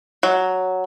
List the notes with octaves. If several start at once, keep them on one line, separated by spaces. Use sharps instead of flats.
F#3